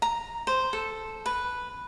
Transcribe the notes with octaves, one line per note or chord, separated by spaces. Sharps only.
A#5
C5
A4
B4